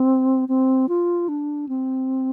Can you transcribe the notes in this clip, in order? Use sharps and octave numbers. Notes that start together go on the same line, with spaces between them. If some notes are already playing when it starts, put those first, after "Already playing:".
Already playing: C4
C4
F4
D4
C4